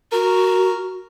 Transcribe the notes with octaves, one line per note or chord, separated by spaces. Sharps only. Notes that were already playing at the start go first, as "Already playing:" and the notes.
F#4 A#4